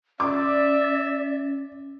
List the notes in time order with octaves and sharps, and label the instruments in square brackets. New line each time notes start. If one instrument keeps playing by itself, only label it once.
[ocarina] C#4 [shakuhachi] D5 [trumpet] E5 [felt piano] D6